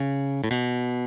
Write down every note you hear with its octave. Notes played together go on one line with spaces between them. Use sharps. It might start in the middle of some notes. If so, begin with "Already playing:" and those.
Already playing: C#3
A2
B2